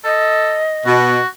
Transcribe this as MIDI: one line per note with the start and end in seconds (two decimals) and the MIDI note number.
0.04 0.60 69
0.04 0.97 75
0.86 1.20 47
0.86 1.27 66